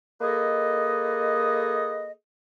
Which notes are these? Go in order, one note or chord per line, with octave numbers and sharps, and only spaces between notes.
A#3 G#4 A4 B4 D#5